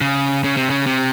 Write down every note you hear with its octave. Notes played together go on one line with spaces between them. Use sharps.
C#3
C#3
C3
C#3
C3